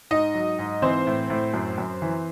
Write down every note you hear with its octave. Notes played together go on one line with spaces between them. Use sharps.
G#2 D#4 D#5
F#3
G#2
E3 C4 C5
A2
A2
F#2
F#2
E3